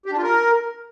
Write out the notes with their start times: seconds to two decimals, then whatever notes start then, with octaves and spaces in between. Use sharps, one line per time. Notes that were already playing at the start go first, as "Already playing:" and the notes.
0.06 G4
0.12 D4
0.17 F4
0.23 A#4